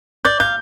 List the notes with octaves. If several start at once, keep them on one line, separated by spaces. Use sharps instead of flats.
D5 G6
F5 G6